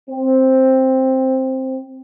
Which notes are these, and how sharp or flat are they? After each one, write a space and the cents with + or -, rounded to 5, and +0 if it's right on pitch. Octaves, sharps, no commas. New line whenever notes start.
C4 +5